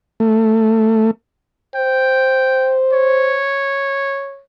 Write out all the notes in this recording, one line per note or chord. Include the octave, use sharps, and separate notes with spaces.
A3
C5 G5
C#5